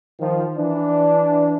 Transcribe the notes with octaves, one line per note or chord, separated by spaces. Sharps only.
D#3 F3
E3 D4